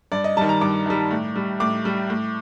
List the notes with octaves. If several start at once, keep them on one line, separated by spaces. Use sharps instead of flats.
G2 D5
D#5
D#3 G3 A5
A#5
G2 D6
D#3 G3
A2
G3
A2 D6
G3
A2